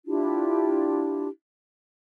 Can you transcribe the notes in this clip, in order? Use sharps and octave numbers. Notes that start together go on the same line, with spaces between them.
D4 E4 F4 G4